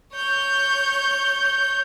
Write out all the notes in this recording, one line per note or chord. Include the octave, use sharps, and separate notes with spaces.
C#5 G6